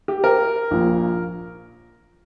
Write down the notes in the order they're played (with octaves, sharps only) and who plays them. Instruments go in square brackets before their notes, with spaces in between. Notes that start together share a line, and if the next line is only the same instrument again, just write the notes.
[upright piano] G4
A#4
A#1 A#2 F3